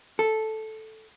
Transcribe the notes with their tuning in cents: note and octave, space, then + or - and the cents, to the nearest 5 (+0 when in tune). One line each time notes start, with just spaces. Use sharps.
A4 -5